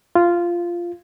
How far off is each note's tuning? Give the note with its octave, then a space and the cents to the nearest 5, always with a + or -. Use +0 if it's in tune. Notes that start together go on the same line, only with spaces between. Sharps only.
F4 -10